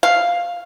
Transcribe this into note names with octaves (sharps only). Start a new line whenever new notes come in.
F5